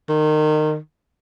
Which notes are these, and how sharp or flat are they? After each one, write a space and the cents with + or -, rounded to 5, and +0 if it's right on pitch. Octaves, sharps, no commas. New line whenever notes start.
D#3 -25